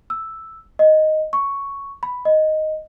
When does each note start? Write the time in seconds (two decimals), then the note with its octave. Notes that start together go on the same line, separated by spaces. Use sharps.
0.10 E6
0.79 D#5
1.33 C#6
2.03 B5
2.25 D#5